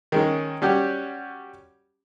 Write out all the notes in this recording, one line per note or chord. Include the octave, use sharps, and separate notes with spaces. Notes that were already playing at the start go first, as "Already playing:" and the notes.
D#3 G#3 C#4
G3 C#4 F#4 G4